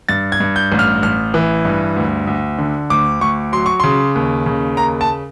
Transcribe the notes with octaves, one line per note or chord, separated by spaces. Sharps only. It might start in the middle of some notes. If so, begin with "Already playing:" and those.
G2 A6
G#6
G2
G6
A1
F6
A1 F6
E3
G2
D2
D2
D3
D2 D6
D2 C#6
F#3 C6
C#6
C#3 C6
D#2
C#3
D#2 A#5
A5